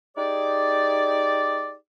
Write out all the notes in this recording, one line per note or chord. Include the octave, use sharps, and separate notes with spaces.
D#4 G4 G#4 D5